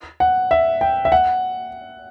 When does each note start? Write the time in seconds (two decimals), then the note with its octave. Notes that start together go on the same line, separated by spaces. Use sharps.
0.20 F#5
0.51 E5
0.81 G5
1.05 E5
1.12 F#5